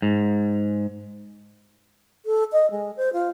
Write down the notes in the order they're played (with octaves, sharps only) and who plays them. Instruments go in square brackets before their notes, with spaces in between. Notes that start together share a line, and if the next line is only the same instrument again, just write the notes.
[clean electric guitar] G#2
[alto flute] A4
D#5
G#3
C5
F4